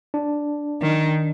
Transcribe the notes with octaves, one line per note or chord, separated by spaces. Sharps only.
D4
D#3